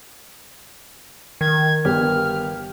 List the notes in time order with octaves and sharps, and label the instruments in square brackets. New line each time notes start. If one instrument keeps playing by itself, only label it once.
[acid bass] D#3 [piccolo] G#6
[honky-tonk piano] G1 [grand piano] G4 [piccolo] F6